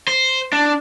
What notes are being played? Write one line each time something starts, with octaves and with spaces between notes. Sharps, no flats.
C5
D4